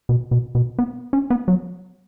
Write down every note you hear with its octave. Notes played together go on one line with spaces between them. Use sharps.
B2
B2
B2
B3
C#4
B3
F#3